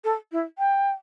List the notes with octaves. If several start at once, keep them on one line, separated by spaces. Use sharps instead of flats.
A4
E4
G5